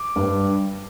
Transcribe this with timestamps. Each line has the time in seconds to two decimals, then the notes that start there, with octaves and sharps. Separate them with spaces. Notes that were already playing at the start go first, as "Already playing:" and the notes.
Already playing: D6
0.16 G2